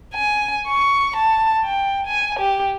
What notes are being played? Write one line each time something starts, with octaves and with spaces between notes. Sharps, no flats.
G#5
C#6
A5
G5
G#5
G4